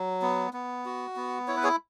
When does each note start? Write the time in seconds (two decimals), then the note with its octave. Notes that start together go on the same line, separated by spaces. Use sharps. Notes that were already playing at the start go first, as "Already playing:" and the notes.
Already playing: F#3
0.22 B3
0.53 B3
0.85 F#4
1.16 B3
1.48 E4 C#5
1.57 B4
1.63 G#4 C#5